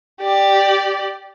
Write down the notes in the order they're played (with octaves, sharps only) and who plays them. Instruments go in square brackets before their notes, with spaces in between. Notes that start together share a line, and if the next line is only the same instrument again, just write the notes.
[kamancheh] G4 D5